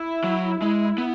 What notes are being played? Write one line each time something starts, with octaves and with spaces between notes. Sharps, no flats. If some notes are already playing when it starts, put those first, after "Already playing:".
Already playing: E4
F#3
G#3 E4
B3